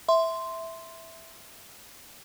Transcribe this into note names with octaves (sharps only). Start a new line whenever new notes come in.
E5 C6